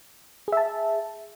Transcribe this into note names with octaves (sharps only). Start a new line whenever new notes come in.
G#4 E5 A5